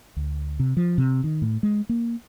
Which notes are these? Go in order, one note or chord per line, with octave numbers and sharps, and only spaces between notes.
D2
C3
F3
C3
D#3
A2
G#3
A#3